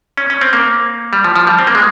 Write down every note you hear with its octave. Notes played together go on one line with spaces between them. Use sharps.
C#4
C#4
C4
A#3
G3
F3
F3
G3
C4
A#3
G#3